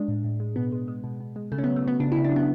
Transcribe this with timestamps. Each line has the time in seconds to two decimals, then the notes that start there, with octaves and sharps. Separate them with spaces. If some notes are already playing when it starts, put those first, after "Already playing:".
Already playing: G#3 D4
0.08 A2
0.24 A2
0.40 G#3
0.56 B2 B3
0.72 G#3
0.88 G#3
1.04 B2
1.20 B2
1.36 G#3
1.52 C#3 A3
1.58 C#4
1.64 B3
1.68 F#3
1.76 A3
1.84 F#3 B3
2.00 C#3 D4
2.12 E4
2.17 C#3
2.24 D4
2.32 F#3 B3